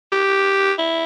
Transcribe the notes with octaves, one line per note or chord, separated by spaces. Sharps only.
G4
E4